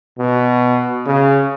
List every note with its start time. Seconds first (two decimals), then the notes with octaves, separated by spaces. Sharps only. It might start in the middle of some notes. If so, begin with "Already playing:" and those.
0.19 B2
1.07 C#3